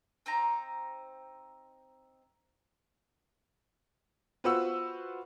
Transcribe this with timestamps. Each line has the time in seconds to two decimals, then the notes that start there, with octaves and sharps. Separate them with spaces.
0.26 C4 D#4 C5 A#5
4.44 F4 F#4 B4 C5 F#5 E6